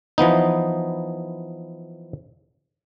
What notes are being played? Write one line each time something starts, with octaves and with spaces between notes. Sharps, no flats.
E3 F3 B3 D#4